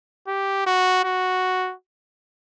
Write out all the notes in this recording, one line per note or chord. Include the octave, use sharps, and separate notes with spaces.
G4
F#4
F#4